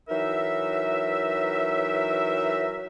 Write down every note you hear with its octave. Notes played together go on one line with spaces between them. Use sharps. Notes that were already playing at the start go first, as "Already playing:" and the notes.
E3 F#3 D#4 A#4 E5